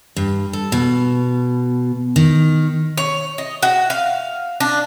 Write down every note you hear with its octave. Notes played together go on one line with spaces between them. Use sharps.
G2
A4
B2
D#3
C#5
D#5
F#4
F5
D4